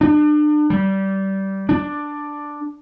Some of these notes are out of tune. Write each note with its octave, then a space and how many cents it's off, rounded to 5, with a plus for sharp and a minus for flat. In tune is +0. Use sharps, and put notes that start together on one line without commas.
D4 +35
G3 -20
D4 +5